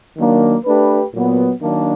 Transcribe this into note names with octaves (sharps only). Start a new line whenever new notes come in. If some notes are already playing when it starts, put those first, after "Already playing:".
D#3 F#3 A#3 D4
A3 D4 G4 B4
A#2 F#3 B3
D#3 F#3 A#3 D4